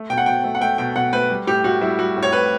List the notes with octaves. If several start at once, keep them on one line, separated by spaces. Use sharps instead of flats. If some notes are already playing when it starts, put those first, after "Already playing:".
Already playing: A3
B2 G5
F#5
B2 G5
A3
F#5
A3 G5
B2 G5
B2 F#5
A3 B4
G3
A2 G4
A2 F#4
G3 E4
G3 F#4
A2
C#5
A2 B4